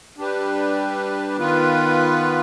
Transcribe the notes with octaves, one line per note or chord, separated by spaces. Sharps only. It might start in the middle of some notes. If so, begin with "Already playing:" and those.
G3 D4 G4 B4
D#3 B3 F4 B4